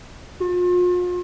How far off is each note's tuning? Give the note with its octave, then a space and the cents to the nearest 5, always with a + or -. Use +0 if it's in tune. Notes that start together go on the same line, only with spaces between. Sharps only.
F4 +40